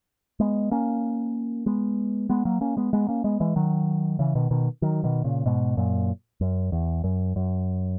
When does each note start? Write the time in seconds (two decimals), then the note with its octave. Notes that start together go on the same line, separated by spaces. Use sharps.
0.40 G#3 B3
0.71 A#3 C#4
1.66 G#3 B3
2.30 G#3 B3
2.45 F#3 A#3
2.61 A#3 C#4
2.77 G#3 B3
2.93 G#3 B3
3.08 A#3 C#4
3.24 G#3 B3
3.40 E3 G#3
3.56 D#3 F#3
4.19 C#3 E3
4.35 B2 D#3
4.51 B2 D#3
4.82 D#3 F#3
5.04 B2 D#3
5.24 A#2 C#3
5.46 G#2 B2
5.77 F#2 A#2
6.41 F#2
6.72 E2
7.04 F#2
7.36 F#2